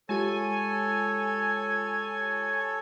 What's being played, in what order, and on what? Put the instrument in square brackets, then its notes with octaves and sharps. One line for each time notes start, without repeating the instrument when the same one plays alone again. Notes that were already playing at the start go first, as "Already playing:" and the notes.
[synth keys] G#3 F4 G4 [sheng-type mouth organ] A4 C#5 [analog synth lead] G#5